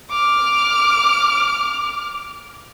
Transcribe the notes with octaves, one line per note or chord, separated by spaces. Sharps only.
D6 F6